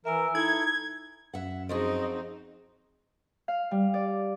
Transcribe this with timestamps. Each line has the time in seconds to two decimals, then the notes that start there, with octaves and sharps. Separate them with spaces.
0.05 E3 A#4 E5 G#5 E6
0.35 D#4 E4 A4 A#5 G#6
1.34 F#2 E5 F#5
1.69 F3 C4 D#4 F#4 G#4 D#5
3.48 F5
3.71 G3
3.94 D5